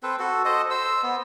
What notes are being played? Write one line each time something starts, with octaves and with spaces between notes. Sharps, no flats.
C4 A4 B4 C5
F#4 A4
A4 C5 D#5
C5 E6
B3